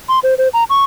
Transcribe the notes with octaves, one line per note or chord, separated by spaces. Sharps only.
C6
C5
C5
A#5
C#6